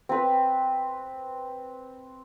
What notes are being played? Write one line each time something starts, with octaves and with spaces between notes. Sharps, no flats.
C4 B4